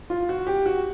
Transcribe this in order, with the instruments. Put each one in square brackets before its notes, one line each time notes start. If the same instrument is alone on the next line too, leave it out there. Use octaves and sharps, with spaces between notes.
[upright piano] F4
F#4
G4
F#4